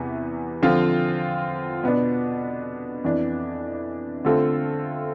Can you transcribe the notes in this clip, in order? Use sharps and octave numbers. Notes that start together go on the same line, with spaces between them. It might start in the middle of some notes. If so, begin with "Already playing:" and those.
Already playing: E2 C3 E3 B3
D3 F3 C4 F4
B2 B3 D4
F2 E3 B3 D4
D3 A3 C4 F4 A4